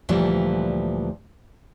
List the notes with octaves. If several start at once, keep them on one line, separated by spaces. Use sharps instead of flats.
D2 A#2 E3 F3 G3 D4